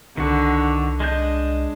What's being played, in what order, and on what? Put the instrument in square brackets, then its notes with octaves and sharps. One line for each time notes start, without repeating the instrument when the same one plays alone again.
[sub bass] C2 [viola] D3 [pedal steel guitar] D#3 F#4
[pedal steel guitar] G#3 D4 G6 [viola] D#5